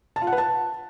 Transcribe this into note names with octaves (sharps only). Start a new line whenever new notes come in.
A5
F4
F#5
B4
A5